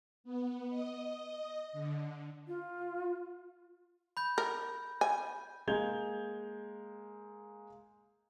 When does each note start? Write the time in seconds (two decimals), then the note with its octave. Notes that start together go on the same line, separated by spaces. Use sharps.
0.24 B3
0.68 D#5
1.73 D3
2.48 F4
4.17 B5 G6
4.38 A#4
5.01 G#5
5.67 G#3 A#3 G6 G#6 F7 G7